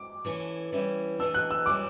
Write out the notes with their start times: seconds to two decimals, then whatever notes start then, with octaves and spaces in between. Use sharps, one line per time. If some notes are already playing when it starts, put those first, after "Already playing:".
Already playing: D6
0.25 E3 A3 C#4 E4
0.72 E3 G3 C#4 E4
1.19 A2 E3 B3 D4 E6
1.34 F#6
1.51 E6
1.66 E3 G3 C#4 E4 D6